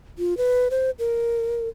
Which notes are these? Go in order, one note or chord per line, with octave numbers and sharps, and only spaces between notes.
F4
B4
C5
A#4